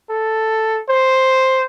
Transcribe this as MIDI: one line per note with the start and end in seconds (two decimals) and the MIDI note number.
0.10 0.81 69
0.89 1.66 72